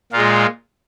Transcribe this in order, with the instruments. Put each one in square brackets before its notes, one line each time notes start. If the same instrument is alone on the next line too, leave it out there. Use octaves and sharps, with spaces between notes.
[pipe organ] A#2 G#3 F4